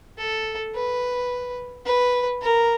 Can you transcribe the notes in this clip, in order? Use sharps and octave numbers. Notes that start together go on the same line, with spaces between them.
A4
B4
B4
A#4